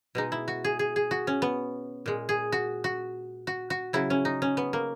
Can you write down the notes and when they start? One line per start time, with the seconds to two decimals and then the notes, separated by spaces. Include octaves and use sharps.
0.15 B2 G#3 D#4
0.32 E4
0.48 F#4
0.64 G#4
0.79 G#4
0.96 G#4
1.11 F#4
1.27 C#4
1.42 B3
2.06 A#2 G#3
2.29 G#4
2.52 F#4
2.84 F#4
3.47 F#4
3.70 F#4
3.93 C#3 F#3 E4
4.10 C#4
4.25 D#4
4.42 C#4
4.57 B3
4.73 A#3